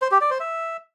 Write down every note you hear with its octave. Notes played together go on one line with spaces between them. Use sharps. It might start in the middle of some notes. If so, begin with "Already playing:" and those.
C5
G4
D5
C5
E5